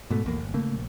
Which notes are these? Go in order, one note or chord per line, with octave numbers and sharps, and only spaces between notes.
G#2 B2 A3
A#1 E2 A#3
G1
C#3 A3 A#3
A#1